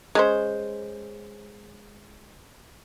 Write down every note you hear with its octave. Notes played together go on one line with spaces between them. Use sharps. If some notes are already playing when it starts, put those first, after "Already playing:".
G#3 C#4 C5